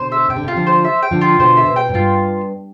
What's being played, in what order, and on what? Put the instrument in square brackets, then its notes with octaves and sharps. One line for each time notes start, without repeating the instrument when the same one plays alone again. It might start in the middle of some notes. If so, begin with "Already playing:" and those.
Already playing: [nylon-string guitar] B2 D3 [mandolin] C5
[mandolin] E5
[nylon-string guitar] C3 [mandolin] G5
[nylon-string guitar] D3
[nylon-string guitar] C3 [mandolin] F4
[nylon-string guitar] D3 F3
[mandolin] C5
E5
G5
[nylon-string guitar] D3 F3
[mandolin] F4
[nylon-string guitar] B2 D3 [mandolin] C5
[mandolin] E5
[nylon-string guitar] B2
[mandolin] G5
[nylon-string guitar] A2
[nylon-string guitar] G2 [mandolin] F4